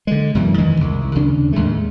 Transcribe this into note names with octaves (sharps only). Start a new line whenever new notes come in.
D3 G#3
F#2 B2 E3 G3
F2 D#3 E3 G#3
C2
D#2 C#3 D4
D#2 A2 G#3 A3